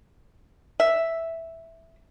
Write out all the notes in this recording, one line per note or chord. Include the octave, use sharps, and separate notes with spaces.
E5